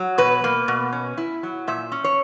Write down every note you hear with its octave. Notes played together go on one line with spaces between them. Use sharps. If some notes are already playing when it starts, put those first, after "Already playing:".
Already playing: F#3
B2 B4
A#3
B2
C#4
E4
F#3
A#2 E5
C#4
C#5